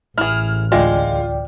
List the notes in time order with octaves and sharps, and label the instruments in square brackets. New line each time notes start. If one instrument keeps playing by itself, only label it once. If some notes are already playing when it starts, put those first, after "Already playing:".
[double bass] A1 [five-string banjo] E4 G#4 [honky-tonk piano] F6
[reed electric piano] D2 D5 G5 [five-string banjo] G#3 [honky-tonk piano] F4